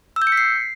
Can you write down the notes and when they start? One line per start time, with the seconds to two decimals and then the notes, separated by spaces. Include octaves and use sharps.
0.16 E6
0.22 G6
0.27 C#7
0.32 B6
0.37 C7